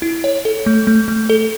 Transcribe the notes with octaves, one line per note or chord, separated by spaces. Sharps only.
E4
C#5
A4
A3
A3
A3
A4